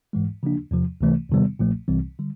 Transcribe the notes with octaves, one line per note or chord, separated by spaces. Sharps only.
G#2 E3 G#3
C#3 F3 A#3 D4
E2 C3 F3
C#2 C3 E3 A3
E2 C3 D#3 G3 B3
B1 A#2 F3 A3
C2 C3 E3 G3 C4
D3 G3